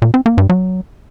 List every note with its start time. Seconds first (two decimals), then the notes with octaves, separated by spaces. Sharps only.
0.02 A#2
0.14 C4
0.26 A#3
0.38 G2
0.49 F#3